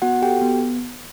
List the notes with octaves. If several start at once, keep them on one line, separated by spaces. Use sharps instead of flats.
B3 F#4 F#5
F#4 G4 A4 G5
B3